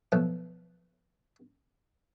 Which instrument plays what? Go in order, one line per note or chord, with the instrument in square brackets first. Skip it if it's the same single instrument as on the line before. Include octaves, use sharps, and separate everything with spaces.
[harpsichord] B2 F3 F#3 A3